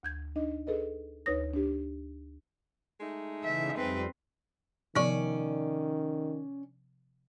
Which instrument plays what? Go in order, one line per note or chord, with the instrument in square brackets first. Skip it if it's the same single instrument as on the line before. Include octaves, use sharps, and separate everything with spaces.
[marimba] D2 G6 G#6
D4 D#4 D#5
G#4 A4 B4 D#5
D2 D#4 B4 C#5 D#6 A#6
D4 G4
[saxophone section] G#3 A3 D#4
[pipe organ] C#3 E3 [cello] E5
[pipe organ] F2 G3 [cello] C4 B4
[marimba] C3 F3 B3 [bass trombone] D#3 [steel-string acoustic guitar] C#4 D5